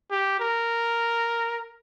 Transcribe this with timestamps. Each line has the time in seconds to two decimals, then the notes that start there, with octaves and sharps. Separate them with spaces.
0.11 G4
0.40 A#4